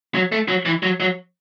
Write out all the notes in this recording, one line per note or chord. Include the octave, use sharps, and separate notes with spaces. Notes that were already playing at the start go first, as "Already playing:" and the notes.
F#3
A3
F#3
E3
F#3
F#3